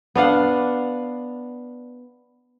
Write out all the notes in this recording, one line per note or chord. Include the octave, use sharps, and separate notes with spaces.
B3 D4 F5 F#5